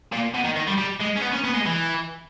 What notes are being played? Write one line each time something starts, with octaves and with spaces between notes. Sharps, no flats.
A#2
B2
D#3
D#3
G3
G3
G#3
C#4
B3
C#4
B3
G#3
E3